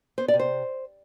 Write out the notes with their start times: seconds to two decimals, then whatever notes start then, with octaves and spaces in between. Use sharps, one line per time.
0.18 B3 C5
0.28 D5
0.34 C3
0.39 C5